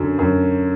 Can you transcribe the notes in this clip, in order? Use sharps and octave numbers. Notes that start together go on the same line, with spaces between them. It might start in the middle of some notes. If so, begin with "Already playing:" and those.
Already playing: F#2 D3 F#3
F#2